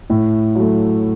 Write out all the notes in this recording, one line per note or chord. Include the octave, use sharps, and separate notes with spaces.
A2
F#3 A3